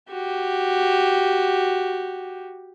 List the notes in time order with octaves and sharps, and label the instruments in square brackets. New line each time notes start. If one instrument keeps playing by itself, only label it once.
[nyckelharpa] F#4 G4